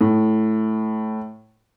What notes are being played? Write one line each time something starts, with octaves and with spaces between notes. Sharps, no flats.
A2